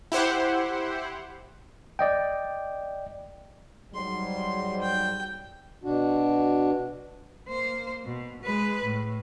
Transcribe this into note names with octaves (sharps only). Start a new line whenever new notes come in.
E4 G4 C5 F#5
D5 D#5 G5
G#2 F#3 G3 C6
G5
B2 D4 F#4
A#3 C5
B2
G#3 B4
A2